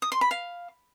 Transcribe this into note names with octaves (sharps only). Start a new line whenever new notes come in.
D#6
C6
B5
F5